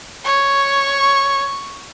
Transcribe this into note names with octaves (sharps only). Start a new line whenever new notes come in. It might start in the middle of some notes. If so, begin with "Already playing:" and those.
C#5 C#6